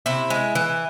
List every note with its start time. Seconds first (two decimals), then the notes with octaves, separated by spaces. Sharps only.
0.06 C3 E4
0.30 G#3
0.55 E3